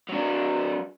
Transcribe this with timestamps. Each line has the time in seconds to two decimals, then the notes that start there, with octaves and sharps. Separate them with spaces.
0.09 F#3 D4